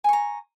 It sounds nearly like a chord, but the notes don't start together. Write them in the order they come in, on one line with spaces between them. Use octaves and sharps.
G#5 C#6 A#5